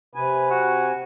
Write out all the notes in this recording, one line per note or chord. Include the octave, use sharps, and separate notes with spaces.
C3 B4 G#5
F#4